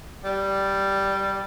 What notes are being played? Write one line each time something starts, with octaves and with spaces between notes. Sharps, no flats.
G3